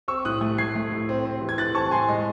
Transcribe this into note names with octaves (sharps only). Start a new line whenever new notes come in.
C4 C#6 E6
A2 D#6 F#6
A3
A3 G#6 C7
A3
A2
C4
C4
E3
G#6
E3 F#6 A6
C4 A5 C#6
A5
A2 G#5 C6
G#3 D#5